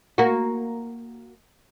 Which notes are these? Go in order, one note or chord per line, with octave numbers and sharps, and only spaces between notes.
A#3 F#4